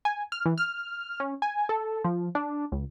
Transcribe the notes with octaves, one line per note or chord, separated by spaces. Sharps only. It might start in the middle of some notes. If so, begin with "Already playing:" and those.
G#5
F6
E3
F6
C#4
G#5
A4
F3
D4
C#2